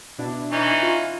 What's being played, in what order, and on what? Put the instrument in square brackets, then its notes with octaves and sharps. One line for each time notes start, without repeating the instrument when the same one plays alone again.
[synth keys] B2 D4 E4
[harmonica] E3 C#4 D#4
[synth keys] F4